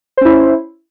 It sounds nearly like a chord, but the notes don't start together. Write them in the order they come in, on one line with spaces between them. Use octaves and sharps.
C5 C#4 E4